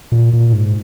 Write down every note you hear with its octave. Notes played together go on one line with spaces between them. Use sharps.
A#2
A#2
G#2